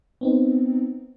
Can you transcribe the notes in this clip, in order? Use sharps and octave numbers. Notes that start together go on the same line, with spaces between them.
B3 C4 D#4